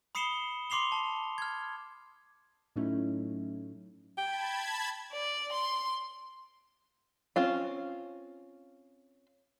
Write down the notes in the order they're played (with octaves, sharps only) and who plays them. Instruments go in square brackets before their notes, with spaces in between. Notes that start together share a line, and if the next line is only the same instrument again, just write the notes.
[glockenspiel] B5 D#6 C7 C#7 E7 G7
C6 D6 C7 F7 G7
A5
F6 G#6
[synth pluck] A2 F#3 A3 C#4 D#4 E4
[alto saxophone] G5 [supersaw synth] A5 B5 G#6
[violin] D5
C6
[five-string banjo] C4 C#4 F4 F5